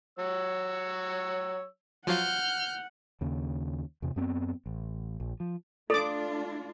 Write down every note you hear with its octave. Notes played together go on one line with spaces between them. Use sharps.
F#3 C#5 E6
F3 F#3 F4 F#5 F6 G6
D#2 C#3 A#3
E2 C3
F#2 B3 C4
A1
A#1
F3
A3 D4 F4 A4 D5 D6